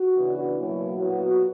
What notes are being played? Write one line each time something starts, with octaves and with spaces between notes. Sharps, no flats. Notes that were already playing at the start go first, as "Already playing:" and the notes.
Already playing: F#4
C#3 E3 B3 D4
B2 F#3 A#3 E4
A#2 F#3 B3 F#4